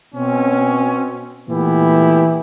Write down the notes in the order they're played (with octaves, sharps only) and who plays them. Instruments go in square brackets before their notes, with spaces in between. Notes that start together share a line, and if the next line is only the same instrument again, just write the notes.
[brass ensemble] B2 C4 C#4
A#2 E3 A3 B3 E4 G4